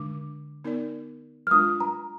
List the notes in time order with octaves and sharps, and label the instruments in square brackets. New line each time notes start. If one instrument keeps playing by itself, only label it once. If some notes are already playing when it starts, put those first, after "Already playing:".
Already playing: [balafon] D3 G#3 D4 [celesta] D6
[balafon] B3 D#4 A#4 D5
[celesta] F6
[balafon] G#3 D4 F4 [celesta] D#6
[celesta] A#5